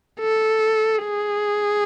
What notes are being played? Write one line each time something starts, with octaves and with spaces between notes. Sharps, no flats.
A4
G#4